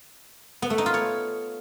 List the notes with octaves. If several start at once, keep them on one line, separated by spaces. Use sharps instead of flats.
B3
A3
D#4
F4
C#5